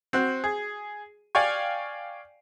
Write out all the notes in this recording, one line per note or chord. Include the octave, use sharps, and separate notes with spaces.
C4 F#4 F#6
G#4
D5 F5 G5 G#5 C#6